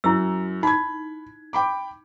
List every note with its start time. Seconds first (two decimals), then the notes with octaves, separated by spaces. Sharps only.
0.04 F#2 E4 E6
0.63 D#4 B5 G#6
1.53 G5 B5 D6